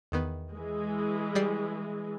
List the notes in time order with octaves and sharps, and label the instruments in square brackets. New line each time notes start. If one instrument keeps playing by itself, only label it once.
[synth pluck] E2 D#3 B3
[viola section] E3 G#3
[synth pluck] G3 D5 C7